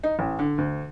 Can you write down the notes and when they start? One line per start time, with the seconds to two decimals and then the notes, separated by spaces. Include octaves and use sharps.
0.04 D#4
0.19 A1
0.39 D3
0.58 D2